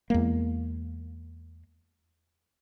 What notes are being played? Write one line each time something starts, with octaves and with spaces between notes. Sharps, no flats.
E2 G#3 A#3